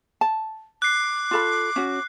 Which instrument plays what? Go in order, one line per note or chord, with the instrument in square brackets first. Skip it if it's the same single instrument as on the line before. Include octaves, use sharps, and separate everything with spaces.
[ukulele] A5
[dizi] D6 [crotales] F#6 C7
[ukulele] F4 A4 B5
C#4 F#4